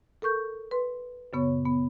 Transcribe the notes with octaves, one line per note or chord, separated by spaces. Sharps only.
A4 A#4 C#6 G6
B4 C6
F#2 A#2 C#3 B3 C#5 C#6
B3